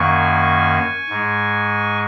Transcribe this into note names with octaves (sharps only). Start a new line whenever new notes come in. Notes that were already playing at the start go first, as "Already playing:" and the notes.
Already playing: F#2 D#3 A#3 G#5 C#6
G#2 G#3